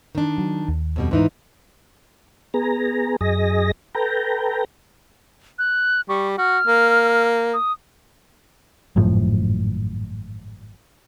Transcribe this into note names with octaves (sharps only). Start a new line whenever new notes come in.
D#3 D4
F#3
D#2
F2 B2 G3
G#2 E3 D#4
B3 G#4 A#5
F#2 G#4 D#5 A#6
A4 B4 G5 A#5
F#6
G3 C#6
F#4 F6
A#3
D#6
G#1 F#2 A2 F3